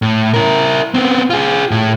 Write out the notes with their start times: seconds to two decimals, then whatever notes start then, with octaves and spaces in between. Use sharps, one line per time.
0.02 A2
0.34 E4 A#4
0.94 B3 C4
1.30 F4 G#4
1.71 A2